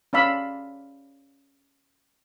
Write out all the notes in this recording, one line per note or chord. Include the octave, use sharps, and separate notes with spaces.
C#4 D5 F5 B5 E6